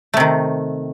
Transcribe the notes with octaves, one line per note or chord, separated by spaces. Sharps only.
C3 D#3 A3